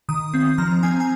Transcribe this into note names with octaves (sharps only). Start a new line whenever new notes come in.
D#3 D#6
C4
F3 A#5
C4 G#5
G#5